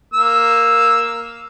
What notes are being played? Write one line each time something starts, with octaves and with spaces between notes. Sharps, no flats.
A#3 E6